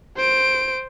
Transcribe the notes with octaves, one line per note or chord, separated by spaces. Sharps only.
C5 D7